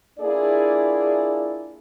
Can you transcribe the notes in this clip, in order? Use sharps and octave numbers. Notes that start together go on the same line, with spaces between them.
A#3 D4 E4 F4 G#4 D5